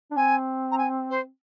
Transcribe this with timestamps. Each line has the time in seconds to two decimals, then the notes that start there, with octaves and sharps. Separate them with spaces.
0.11 D4
0.17 C4 G#5
0.72 A#5
0.78 G#5
1.10 C5